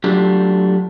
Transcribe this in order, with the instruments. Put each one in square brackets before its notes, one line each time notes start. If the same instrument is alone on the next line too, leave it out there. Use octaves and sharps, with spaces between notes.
[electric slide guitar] F#3 A3 D4 F4 G4